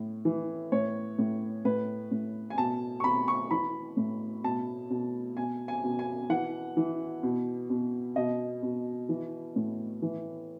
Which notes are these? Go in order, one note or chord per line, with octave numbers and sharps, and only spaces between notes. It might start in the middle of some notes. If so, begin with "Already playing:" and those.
Already playing: A2
E3
A2 C#5
A2
A2 B4
A2
G#5
B2 A5
C#6
B2 B5
C#6
E3 B5
A2
B2 A5
B2
B2 G#5
G#5
B2
G#5
E3 F#5
E3
B2
B2
B2 D#5
B2
E3
A2
E3